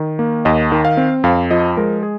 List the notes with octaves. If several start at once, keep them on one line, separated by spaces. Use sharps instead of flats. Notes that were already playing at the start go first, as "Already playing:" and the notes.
Already playing: D#3
A#3
D#2 D#5
D#3
F5
C4
F2 F5
F3 D#5
G#3 A#4
G#4